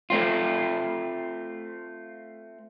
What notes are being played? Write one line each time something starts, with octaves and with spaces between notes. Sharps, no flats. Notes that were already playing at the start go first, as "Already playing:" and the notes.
A3 C4 F4